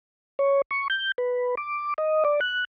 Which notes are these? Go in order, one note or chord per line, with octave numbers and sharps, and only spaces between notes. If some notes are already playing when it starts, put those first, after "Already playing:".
C#5
C#6
G6
B4
D6
D#5
D5
F#6